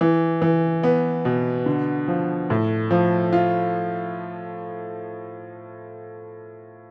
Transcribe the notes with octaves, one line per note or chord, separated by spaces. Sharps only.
E3
E3
B3
B2
D3
F3
A2
F3
F4